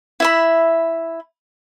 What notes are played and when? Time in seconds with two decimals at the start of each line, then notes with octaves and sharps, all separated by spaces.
0.20 E4 E5 B5